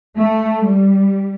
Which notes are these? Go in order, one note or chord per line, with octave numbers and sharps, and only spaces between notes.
A3
G3